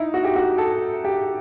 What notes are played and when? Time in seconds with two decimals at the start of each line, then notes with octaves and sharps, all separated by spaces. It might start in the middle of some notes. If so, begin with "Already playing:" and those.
Already playing: D#4 E4
0.14 F#4
0.24 G4
0.35 F#4
0.58 A4
1.04 G4